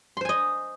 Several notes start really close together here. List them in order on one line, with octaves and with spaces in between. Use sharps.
C6 C5 G#5 D#5